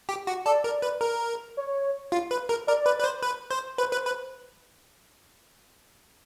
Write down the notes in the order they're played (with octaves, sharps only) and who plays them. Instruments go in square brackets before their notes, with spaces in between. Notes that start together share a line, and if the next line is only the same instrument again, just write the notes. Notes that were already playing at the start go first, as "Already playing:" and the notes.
[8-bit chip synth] G4
F#4
[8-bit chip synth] A4 [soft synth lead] D5
[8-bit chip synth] A#4
B4
A#4
[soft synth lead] C#5
[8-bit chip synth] F4
B4
A#4
[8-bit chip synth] A#4 [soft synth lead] D5
[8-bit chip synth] B4
B4
C5
B4
C5
[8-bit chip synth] B4 [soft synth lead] C5
[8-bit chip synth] B4
B4